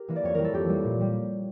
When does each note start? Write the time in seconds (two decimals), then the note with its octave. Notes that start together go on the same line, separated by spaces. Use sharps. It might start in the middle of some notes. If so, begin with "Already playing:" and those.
Already playing: G4 A#4
0.08 E3 A#3
0.16 D5
0.24 F2 C#5
0.35 E3 G3 A#3 A#4
0.44 A4
0.53 F2 G4
0.69 E3 G3 A#3
0.84 A#2
1.00 G3 A#3